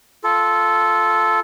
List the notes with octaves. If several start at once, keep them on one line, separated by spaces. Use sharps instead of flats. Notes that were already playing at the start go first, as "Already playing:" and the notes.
F4 A4